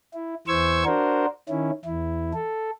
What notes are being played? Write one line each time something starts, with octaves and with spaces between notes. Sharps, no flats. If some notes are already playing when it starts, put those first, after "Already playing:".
E4
E2 E3 C5 C#6 E6 G#6
D4 F#4 A#4 C5
D#3 C#4 E4
E2 E4
A4